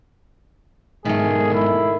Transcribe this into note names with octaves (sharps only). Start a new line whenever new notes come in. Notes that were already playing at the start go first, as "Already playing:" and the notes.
B1 G#2 D#3 A3 G#4
E4